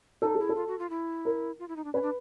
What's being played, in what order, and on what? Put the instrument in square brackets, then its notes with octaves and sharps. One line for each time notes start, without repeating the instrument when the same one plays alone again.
[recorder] D#4 [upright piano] A4
[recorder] E4 [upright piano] G#4
[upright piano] A4
[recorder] F4
F#4
F4
E4
[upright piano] A#4
[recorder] F4
E4
D#4
D4
[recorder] C#4 [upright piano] B4
[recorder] D4